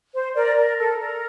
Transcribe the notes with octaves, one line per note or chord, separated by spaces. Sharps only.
C5
A#4 D5
A#4
A4
A#4